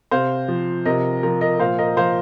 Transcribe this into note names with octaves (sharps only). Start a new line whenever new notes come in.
C3 C5 F5
F3
C3 A#4 D#5
F3 A#4
A#4 D#5
A#2 C5 F5
A#4 D#5
F3 C5 F5